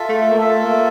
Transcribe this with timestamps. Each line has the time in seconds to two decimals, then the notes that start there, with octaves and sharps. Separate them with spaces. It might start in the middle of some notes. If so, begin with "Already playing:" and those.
Already playing: F4 A4 E5
0.09 A3
0.31 A#3
0.38 A3 F4 A4 E5
0.65 A#3